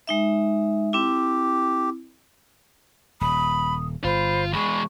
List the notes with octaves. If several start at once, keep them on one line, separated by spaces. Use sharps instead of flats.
G#3 D#4 E5
C4 E4 G4
D#1 B5 D#6
G1 F4 C5 B5
E2 G#3 B5 C#6